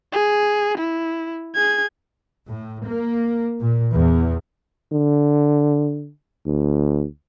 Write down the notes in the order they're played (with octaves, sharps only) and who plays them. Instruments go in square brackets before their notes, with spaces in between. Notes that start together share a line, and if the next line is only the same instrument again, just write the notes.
[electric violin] G#4
E4
G#4 G#6
[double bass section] A2
A#3
A#2
E2
[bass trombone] D3
D2